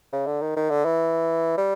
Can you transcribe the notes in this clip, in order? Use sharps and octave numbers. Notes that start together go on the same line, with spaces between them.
C#3
D3
D#3
D#3
D3
E3
G3